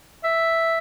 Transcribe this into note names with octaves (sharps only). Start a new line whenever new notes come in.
E5